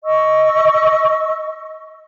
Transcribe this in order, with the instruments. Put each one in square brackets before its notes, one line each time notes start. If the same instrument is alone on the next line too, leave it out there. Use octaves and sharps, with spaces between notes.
[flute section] D#5 C#6 E6